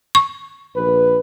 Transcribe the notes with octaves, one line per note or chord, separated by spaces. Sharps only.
C#6
A#1 B4